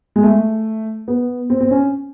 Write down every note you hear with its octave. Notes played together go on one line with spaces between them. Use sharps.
G#3
A3
B3
C4
C4
C#4